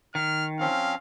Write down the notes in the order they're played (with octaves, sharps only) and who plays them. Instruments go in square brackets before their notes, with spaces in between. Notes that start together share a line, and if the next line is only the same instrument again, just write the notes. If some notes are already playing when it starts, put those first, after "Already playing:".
[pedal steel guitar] D#3 [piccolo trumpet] F6
[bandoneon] F3 C4 C#4 [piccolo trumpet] F5